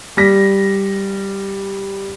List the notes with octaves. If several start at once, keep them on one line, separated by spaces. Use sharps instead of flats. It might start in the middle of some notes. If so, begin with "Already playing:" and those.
G3 A#6 B6